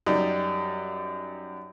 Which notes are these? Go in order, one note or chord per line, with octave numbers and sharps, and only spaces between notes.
F#2 G3 D#4